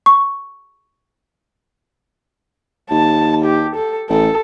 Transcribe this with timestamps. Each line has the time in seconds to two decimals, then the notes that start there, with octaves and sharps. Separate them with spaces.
0.06 C#6
2.91 D#2 A5
3.45 G4
3.76 A4
4.10 A1 A4